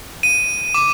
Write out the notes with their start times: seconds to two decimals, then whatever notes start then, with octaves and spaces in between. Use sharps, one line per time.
0.23 D#7
0.74 D6